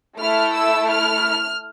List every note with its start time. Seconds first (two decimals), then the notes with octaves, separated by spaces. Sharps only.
0.19 A3 E4 A4 F6
0.54 E6
0.88 F6